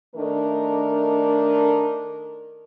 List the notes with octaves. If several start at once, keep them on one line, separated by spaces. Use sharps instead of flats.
D#3 A3 D4 A#4